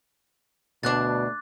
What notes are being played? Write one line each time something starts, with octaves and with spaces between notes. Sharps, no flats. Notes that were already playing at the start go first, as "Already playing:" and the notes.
D2 B2 D4 D6 F#6 A6